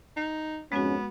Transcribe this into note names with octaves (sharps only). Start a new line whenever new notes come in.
D#4
F2 G#2 G#3 B3 C#4 F#4